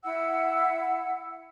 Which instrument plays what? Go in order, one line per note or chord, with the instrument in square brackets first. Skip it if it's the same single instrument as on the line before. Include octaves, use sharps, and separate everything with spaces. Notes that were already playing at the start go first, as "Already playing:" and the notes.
[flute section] E4 F#5 E6